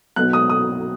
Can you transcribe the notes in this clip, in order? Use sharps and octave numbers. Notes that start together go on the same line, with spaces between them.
B1 B2 F#3 B3 F#6
D#6
D#6